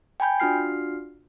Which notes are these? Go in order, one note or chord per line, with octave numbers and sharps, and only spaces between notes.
G5 G#5 B5 G6
D4 F4 F#4 F6 C7